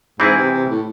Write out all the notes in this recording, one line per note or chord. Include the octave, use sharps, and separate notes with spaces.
G#2 E3 C4 E4 G#4
C3
C3
A2